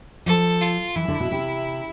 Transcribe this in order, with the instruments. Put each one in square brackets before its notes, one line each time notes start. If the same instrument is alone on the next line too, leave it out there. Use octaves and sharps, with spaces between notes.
[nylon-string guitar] F3 [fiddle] A4
[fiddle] F4
[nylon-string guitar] E3 [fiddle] E4
[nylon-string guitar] D3
B2
C3